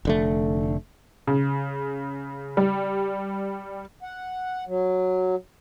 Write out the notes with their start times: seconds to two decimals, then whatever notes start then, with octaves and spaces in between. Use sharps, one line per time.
0.05 F1 D3 A3
1.27 C#3
2.57 G3
4.03 F#5
4.67 F#3